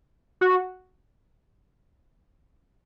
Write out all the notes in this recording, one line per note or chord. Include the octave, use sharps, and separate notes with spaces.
F#4